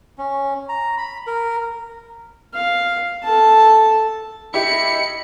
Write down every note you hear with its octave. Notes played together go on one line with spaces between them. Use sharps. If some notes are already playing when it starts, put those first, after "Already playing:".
C#4
A#5
B5
A#4
F5
A4 A5
E4 G4 D#5 B5 C#7